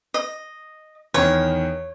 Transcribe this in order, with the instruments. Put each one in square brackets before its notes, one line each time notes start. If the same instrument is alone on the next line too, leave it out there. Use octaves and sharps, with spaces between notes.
[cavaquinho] D#5
[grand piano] E2 D#3 [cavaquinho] C#5